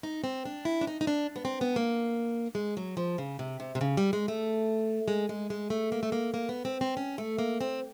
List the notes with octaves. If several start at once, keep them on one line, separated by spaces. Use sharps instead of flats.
D#4
C4
D4
E4
D4
D#4
D#4
D4
B3
C4
B3
A#3
G#3
F#3
F3
C#3
C3
C3
C3
C#3
G3
G#3
A3
G#3
G#3
G#3
A3
A#3
A3
A#3
A#3
B3
C4
C4
C#4
A3
A#3
C4